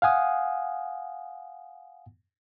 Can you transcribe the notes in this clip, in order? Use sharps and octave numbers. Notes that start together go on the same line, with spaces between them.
F5 F#5 G#5 D#6